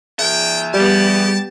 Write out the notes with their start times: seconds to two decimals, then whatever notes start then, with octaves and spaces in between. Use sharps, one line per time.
0.19 G#4 E5 G5
0.74 G3 B3 G4 A5